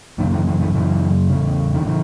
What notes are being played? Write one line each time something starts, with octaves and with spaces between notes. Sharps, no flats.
F#2 C#3 D#3
E3
E3
E3
F#2 C#3 E3
E2 C#3
D#3
C#3 E3